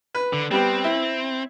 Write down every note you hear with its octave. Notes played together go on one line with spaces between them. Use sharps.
B4
D3
G3 B3 C4 G4
E4